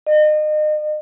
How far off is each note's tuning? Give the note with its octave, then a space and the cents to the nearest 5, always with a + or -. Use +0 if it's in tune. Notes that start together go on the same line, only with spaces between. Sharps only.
D#5 -35